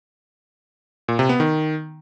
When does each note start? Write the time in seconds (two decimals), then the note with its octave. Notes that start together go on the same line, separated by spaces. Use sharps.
1.08 A#2
1.19 C3
1.29 B3
1.40 D#3